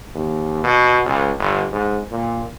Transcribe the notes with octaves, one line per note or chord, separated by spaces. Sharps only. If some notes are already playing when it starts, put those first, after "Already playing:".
D#2
B2
C#2
G1
G#2
A#2